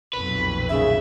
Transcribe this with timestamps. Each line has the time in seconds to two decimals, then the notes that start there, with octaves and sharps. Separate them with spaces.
0.13 B1 F2 A#2 B4
0.69 D#2 C#3 E5